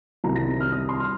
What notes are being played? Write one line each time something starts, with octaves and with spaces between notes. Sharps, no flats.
C2 C3 D#3 G3 A#5
A#6
F6
D#6
C6
F6